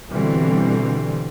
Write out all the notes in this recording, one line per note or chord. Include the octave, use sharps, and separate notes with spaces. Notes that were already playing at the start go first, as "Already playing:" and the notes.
B2 D3 E3 G3 C4